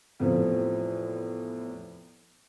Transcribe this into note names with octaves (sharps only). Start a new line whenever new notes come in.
E2 A2 C3 F3